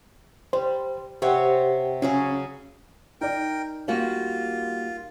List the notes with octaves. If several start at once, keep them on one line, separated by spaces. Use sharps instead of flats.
G3 C5
C3 C4 G4 C#5 F#5
C#3 F#3 C#4 G#4
D#4 A#4 D5 G5
G3 A#3 F4 F#4